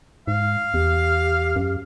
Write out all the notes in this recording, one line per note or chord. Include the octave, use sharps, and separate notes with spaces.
G#2 F5
E2 G4
F#2